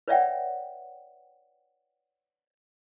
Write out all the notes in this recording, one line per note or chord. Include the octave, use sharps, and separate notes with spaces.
B4 C#5 D5 E5 F#5 G5